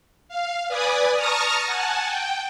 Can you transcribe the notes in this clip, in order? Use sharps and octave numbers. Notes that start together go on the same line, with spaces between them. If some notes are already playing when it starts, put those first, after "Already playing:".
F5
B4 D5 G#5 D#6
A5 A#5 C#6 D#6 F6 A#6
F#5 G#5 A5
G5